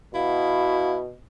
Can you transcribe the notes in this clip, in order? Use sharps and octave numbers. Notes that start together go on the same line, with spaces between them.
B2 E4 F#4 F5